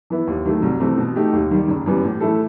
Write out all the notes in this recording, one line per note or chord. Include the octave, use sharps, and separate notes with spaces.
E3 B3 E4
D#2
D#3 F#3 A3
C2
C3 E3 A3 C4
B2
A3 D#4 G4
D#2
D#3 G3
F#1
F#2 E3 G3 B3
A2
E3 A3 E4 A4